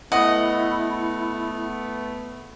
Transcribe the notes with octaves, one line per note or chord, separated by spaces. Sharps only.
A3 B3 E4 D#5 F#5